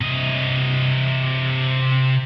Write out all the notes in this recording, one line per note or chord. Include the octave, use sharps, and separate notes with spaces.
C3 D#5